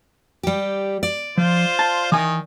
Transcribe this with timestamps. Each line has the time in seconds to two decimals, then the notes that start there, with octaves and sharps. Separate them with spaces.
0.43 G3 G4
1.03 D5
1.38 F3 F4 C5
1.79 A5
2.12 D#3 E3 G#5 D#6